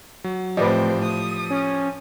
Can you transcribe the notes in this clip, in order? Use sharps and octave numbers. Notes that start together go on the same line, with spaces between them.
F#3
A2 E3 F3 C4 G4 B4 D5 D#5
D#6
C#4